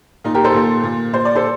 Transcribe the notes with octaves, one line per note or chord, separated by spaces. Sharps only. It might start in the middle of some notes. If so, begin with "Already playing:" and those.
A#2 D#4
G4 A#4
A4 C5
A#2
A#2
A#2 C5
D5
A4 C5